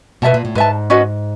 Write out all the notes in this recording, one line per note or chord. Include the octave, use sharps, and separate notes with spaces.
B2 B4 E5 A5
A#2
A2
G#2 B4 E5 A5
C#4 F#4 B4 D#5